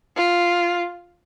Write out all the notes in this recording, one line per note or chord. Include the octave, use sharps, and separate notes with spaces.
F4